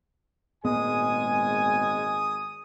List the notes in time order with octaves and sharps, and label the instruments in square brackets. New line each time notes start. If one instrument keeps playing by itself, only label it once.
[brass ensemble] G#1 G#4 G#5 [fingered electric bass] A#2 B3 [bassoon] G#3 [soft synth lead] D#6